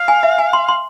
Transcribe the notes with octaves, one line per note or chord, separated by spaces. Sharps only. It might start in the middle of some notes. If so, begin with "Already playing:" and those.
Already playing: F5
G#5
E5
G#5
C6
C6